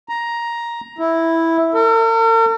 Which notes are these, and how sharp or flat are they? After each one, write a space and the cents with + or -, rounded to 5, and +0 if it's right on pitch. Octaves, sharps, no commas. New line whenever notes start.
A#5 +10
E4 -5
A#4 -45